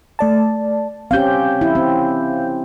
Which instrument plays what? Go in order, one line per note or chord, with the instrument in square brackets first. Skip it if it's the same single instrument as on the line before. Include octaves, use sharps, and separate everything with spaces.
[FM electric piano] A3 D5 A5
[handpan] C4 C#4 G4 [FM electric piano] F5 G6
[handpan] E4
C4